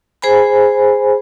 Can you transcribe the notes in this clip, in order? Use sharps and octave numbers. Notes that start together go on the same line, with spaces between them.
G#4 C5 G#5 B5